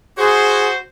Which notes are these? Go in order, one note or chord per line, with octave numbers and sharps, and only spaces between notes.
F#4 G#4 C5